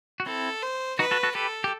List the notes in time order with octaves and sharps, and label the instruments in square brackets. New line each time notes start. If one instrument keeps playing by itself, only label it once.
[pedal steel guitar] F#4
[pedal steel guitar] C4 E4 [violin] A4
[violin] C5
[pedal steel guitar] D#4 F#4 [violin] B4
[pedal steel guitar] F#4 A4
F#4 A4
[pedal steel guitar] G4 B4 [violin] A4
[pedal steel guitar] G4